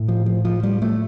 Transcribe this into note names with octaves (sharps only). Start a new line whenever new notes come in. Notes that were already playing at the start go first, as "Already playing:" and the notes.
Already playing: A2
F3
F3
F3
G3
A3